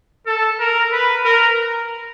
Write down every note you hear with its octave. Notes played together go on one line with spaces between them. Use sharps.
A4
A#4
B4
A#4